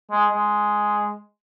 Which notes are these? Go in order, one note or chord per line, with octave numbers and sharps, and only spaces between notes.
G#3
G#3